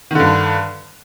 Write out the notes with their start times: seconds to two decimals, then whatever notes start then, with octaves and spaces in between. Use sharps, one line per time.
0.11 D#3
0.15 D3
0.20 G2